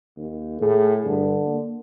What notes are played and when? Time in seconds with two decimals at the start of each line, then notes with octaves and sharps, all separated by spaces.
0.17 D#2
0.61 A2 G#4
1.05 G2 D3
1.46 A#3